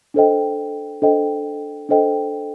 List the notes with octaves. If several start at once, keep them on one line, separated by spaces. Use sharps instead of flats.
D4 A4 C5 D#5 G5
D4 A4 C5 D#5 G5
D4 A4 C5 D#5 G5